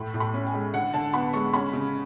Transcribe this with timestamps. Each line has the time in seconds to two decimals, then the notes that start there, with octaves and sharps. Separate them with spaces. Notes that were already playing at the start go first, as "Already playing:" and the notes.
Already playing: A2 B5
0.14 A2
0.20 B5
0.34 C#4
0.47 G#5
0.54 G#3
0.74 D3 F#5
0.93 D3 A5
1.13 B3 B5
1.33 G#3 C#6
1.54 C#4 B5
1.73 C#3